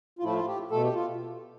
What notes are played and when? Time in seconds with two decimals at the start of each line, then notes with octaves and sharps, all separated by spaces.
0.19 F4
0.23 A2 F3 A3 E4
0.35 F4
0.47 G4
0.71 B2 A3 A4
0.83 G4
0.95 F4